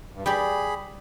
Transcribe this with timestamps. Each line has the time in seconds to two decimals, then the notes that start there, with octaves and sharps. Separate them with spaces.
0.14 G2
0.26 G3 G4 G#4 D5 B5